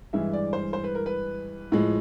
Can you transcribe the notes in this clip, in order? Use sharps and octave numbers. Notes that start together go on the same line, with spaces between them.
G2 E3 G#3 E5
D5
C5
C5
B4
A#4
B4
A2 F3 G#3